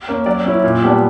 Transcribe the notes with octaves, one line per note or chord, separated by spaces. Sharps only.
A#3 C#4
F#3 D5
C#4 E4
A#2
G3 B3 D4